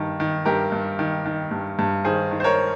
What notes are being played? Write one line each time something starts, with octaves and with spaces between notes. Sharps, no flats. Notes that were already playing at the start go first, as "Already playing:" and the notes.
Already playing: G2 D#3
D#3
G2 G4 A#4
G2
D#3
D#3
G2
G2
D#3 G#4 C5
D#3
C5
A#4 C#5